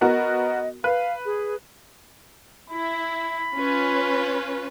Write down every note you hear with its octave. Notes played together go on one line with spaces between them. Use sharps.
B3 F#4 A#4 D#5
B4 F5
G#4
E4 B5
C#4 F4 B4